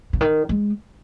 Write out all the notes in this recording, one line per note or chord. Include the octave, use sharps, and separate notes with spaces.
C#3
D#3
G#3